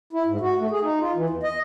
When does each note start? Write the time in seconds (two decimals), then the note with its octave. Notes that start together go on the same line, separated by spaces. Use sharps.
0.13 E4
0.26 G#2
0.41 F#4
0.58 A3
0.71 G#4
0.83 D#4
1.00 F4
1.15 E3
1.30 E2
1.43 D#5